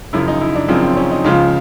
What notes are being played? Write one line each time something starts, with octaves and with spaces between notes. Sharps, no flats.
F#2 C#3 F3 E4
D#4
E4
D4
F#2 C#3 F3 C4
C4
C#4
D#4
C#2 C#3 F3 F4